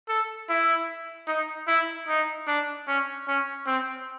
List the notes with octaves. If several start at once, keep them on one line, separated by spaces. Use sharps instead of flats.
A4
E4
D#4
E4
D#4
D4
C#4
C#4
C4